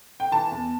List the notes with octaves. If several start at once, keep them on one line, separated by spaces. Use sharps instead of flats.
G5
E3 A5
E2